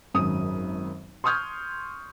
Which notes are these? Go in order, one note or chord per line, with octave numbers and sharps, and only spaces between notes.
G#1 F#2 D#6
C6 C#6 D#6 F6 G6 G#6